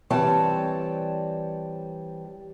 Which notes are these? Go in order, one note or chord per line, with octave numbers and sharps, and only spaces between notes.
E3 G3 C4 C#5 A5